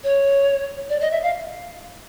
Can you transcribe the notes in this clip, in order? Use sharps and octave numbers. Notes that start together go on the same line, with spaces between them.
C#5
D5
D#5
E5
F5